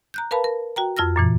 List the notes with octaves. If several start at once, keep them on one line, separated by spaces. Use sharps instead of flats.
A#5 F#6 G6
A#4 B4 F5 A5 B5
A#4
F#4 G5 A#5
F2 F4 E6 F6 A#6
F#2 A#2 E3